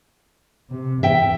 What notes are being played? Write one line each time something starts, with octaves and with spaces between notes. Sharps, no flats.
C3
E2 E5 G5